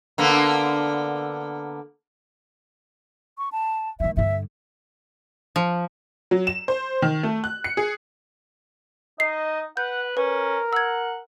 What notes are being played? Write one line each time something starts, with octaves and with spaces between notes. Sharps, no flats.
D3 A#3 B3
C#6
A5
D#3 G#3 E5
G2 D3 E5
F3
F#3
E7
C5
D#3
A3
F#6
C#7
G#4
D#4 D#5 C7
B4 F#5 G6
C#4 A#4 B4
F#5 E6 G#6